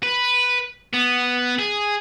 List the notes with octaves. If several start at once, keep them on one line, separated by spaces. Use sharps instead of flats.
B4
B3
G#4